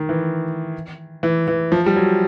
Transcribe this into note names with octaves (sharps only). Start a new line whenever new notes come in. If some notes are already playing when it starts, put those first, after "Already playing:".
Already playing: D#3
E3
E3
E3
F3
G3
F#3